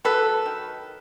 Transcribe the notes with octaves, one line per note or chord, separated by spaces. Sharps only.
F#3 A4 B4
D#3